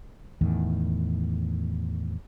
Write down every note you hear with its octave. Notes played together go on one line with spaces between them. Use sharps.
E2 A2 D#3